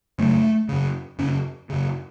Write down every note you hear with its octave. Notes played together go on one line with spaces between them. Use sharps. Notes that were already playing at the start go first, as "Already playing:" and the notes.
F#2 C#3 A3
F#2 C#3
F#2 C#3 C#4
F#2 C#3